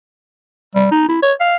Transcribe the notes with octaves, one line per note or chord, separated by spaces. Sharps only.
G3
D#4
E4
C#5
F5